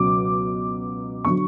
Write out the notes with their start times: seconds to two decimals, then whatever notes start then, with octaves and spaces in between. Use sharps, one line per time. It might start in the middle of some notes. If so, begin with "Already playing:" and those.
Already playing: C#2 B2 F#3 D6
1.25 D3 F#3 C#6